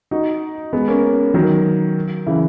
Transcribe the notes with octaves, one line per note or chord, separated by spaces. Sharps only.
D#4 F#4
G#3 B3
A#3 C#4
D#3 F#3
C#3 E3